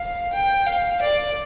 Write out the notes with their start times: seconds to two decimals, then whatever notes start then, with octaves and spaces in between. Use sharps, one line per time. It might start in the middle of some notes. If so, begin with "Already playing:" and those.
Already playing: F5
0.33 G5
0.67 F5
1.02 D5